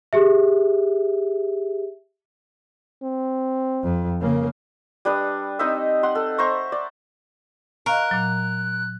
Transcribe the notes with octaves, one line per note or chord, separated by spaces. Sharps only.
G4 G#4 E5
C4
F2
C#3 A#3
G3 D4 B4 D#6
C4 D#4 D#5 E5
F#5 C6
A4
C5 E5 A#5 C#6
D5
A#4 D#5 F5 C#6 F#6
A#2 F#3